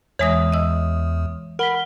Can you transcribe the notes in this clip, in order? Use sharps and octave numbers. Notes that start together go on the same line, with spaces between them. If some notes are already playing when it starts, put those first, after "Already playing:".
E2 E3 G#3 C#5 E5 D#6 A#6
D#5 E6
A#4 F#5 B5 F6 B6 G7